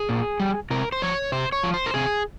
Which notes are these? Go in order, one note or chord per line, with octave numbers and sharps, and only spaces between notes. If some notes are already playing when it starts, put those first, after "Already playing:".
Already playing: G#4
A#2
G3
C3 A#4
C5
F3 C#5
C3 C5
C#5
F3
C5
A#4
C3 G#4